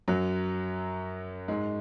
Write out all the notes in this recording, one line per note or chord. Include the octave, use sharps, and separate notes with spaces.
F#2 F#3
G#2 G#3